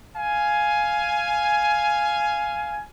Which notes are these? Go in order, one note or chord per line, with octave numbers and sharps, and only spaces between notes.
F5 G#5